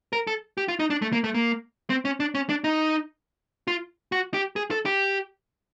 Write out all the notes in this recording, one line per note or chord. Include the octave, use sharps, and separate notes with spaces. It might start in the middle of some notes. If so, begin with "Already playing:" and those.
A#4
A4
G4
F4
D#4
D4
A3
A#3
A3
A#3
C4
C#4
D4
C#4
D4
D#4
F4
F#4
G4
G#4
A4
G4